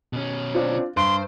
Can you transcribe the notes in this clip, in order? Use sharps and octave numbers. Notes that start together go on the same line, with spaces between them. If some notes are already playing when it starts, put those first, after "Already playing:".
B2 C#4
C4 D4 F4
G2 C5 C6 D7